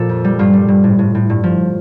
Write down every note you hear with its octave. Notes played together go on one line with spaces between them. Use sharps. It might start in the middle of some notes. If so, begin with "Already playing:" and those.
Already playing: A#2 F3 A4
F2
G3
G2 F4
G3
G2
A2
A2
A2
G2
F3